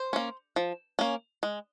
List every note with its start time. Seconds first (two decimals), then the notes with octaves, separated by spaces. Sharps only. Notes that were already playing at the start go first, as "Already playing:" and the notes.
Already playing: C5
0.13 A#3 C#4
0.56 F3
0.99 A#3 C#4
1.43 G#3